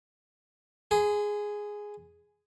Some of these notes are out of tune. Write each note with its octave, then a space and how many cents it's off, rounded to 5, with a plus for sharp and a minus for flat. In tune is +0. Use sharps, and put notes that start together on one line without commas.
G#4 +0 C6 -40